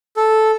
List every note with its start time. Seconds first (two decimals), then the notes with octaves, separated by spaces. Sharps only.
0.17 A4